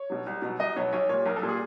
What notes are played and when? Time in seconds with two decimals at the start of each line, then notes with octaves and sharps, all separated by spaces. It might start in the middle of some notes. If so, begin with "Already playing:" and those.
Already playing: C#5
0.10 B2 F#3
0.26 C2
0.42 B2 F#3
0.59 C2 D#5
0.76 B2 F#3 C#5
0.93 B1 C#5
1.09 A#2 G3 C#5
1.26 B1 A#4
1.36 A4
1.42 A#2 G3
1.49 G#4